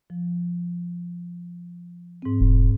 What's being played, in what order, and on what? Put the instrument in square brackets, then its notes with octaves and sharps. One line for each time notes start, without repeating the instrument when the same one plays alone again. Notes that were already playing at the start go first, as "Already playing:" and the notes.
[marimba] F3
G#2 C4
[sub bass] E1